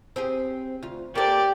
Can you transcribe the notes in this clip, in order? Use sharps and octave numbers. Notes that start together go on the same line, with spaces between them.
C4 G4 G#4
D2 F4
A#3 G4 A4 C5 D5